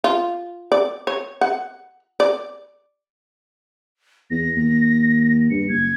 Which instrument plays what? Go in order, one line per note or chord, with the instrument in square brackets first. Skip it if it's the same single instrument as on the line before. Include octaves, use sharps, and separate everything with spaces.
[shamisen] F4
D5
C#5
F#5
D5
[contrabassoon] E2 [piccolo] A#6
[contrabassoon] D#2
[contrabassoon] G2 [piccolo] C#7
[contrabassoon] F#1 [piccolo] G#6